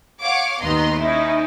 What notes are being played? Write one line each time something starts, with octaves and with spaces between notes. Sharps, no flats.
C#5 F5 F#5 D6
D#2 D#3 B3 D#5 A#5 C6
C#4 D#4 E4 A#4